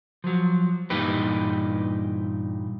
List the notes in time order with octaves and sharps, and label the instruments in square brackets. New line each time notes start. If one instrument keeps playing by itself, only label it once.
[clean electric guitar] F3 F#3
G2 A#2 E3 D#4 G4 B4